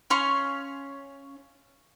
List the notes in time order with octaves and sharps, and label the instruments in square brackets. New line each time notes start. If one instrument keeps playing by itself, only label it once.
[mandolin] C#4 F5 C6 C#6